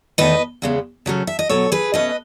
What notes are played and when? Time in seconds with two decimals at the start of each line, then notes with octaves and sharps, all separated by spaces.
0.18 E2 D#3 A3 B4 D#5
0.62 E2 C#3 G#3 B3
1.06 C#3 F#3 A3 C#4
1.27 E5
1.39 D#5
1.49 B2 F#3 B3 A4 C#5
1.72 G#4 B4
1.94 B2 A3 C#4 B4 D#5